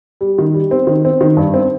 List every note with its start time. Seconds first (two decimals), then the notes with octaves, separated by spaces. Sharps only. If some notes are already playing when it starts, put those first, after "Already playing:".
0.21 G3
0.38 D#3
0.54 G3
0.71 C4
0.87 D#3
1.05 C4
1.21 D#3
1.37 G2
1.54 C4